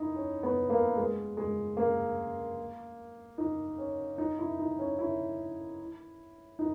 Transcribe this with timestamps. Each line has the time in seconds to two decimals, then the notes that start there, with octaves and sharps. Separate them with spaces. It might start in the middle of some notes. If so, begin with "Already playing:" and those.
Already playing: D#4 E4
0.16 C#4
0.43 B3
0.70 A#3
0.97 G#3
1.37 G#3
1.77 A#3
3.38 D#4
3.78 C#4
4.18 D#4
4.39 E4
4.59 D#4
4.79 C#4
4.99 E4
6.59 D#4